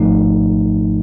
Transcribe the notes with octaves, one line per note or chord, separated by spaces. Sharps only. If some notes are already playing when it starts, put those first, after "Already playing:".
Already playing: G#1 G#2 F3 A3 D#4